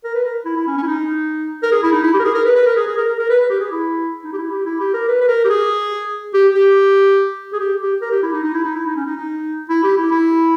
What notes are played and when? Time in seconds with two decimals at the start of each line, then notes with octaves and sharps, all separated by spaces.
0.04 A#4
0.15 B4
0.25 A#4
0.45 E4
0.56 E4
0.67 C#4
0.77 C#4
0.83 E4
0.87 D#4
1.63 A#4
1.72 G#4
1.83 E4
1.93 D#4
2.03 E4
2.14 G4
2.20 A#4
2.24 G#4
2.34 A#4
2.45 B4
2.56 B4
2.66 A#4
2.77 G#4
2.87 G#4
2.97 A#4
3.08 A#4
3.18 A#4
3.29 B4
3.40 B4
3.50 G4
3.60 G#4
3.71 E4
4.24 D#4
4.33 G4
4.38 E4
4.51 G4
4.66 E4
4.80 G4
4.94 A#4
5.08 B4
5.21 B4
5.28 A#4
5.45 G4
5.50 G#4
6.34 G4
6.54 G4
7.53 G#4
7.60 G4
7.81 G4
8.01 A#4
8.12 G4
8.23 E4
8.33 D#4
8.44 D#4
8.54 E4
8.64 D#4
8.75 E4
8.86 D#4
8.96 C#4
9.06 D#4
9.17 D#4
9.69 E4
9.83 G4
9.97 E4
10.11 E4